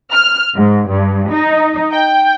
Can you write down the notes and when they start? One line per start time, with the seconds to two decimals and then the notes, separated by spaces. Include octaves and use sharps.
0.12 F6
0.55 G#2
0.89 G2
1.30 D#4
1.92 G5